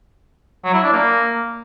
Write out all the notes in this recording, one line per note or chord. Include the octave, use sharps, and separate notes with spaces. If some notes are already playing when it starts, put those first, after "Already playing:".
F#3
E4
D4
A#3